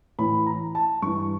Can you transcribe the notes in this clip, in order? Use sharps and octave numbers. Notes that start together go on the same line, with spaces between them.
A2 E3 B5
A#5
A5
G2 E3 C#6